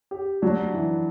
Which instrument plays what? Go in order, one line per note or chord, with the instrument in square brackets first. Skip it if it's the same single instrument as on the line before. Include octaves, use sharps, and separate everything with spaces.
[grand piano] G4
[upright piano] F#3 [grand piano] D4
[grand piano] E3